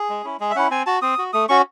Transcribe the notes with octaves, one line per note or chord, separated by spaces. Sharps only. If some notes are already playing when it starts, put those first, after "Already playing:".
Already playing: G#4
G#3
C#4 E4
G#3 G#4
E5
C#4 E4 F#5
C4 G#5
F#4 A5
C4 D#6
F#4
A3 D#6
C#4 F#4 C#6